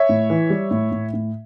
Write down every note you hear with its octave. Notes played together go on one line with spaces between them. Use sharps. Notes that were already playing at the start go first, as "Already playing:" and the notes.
Already playing: C#5 E5
A2
E3
G3
A2
A2
A2